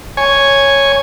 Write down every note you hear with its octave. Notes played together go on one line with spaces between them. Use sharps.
C#5 G#5